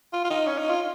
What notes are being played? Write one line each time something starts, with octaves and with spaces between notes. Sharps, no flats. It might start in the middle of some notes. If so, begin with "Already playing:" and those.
F4
F4
D#4
C#4
D#4
F4